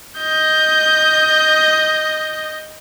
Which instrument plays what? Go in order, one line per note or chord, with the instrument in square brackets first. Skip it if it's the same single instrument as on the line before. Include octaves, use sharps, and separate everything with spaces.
[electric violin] D#5 G6